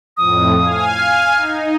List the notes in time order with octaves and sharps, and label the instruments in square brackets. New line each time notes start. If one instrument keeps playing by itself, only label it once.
[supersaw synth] F2 A2 [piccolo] D#6
[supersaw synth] F5 G#5
[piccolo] F6
[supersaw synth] D#4